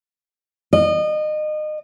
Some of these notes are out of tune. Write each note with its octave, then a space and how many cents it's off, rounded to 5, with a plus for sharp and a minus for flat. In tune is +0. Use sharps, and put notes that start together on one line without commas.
D#5 -30